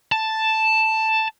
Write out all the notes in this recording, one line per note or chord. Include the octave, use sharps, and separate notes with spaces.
A5